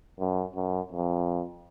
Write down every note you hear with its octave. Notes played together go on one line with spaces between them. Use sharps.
F#2
F#2
F2